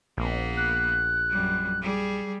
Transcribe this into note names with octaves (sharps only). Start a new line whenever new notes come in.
A#1 A#3 B3
F#6
F#2 G3
G3 G#4